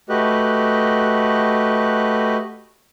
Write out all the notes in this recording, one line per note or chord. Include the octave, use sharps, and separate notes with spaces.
A3 F#4 G4 B4 D#5 F#6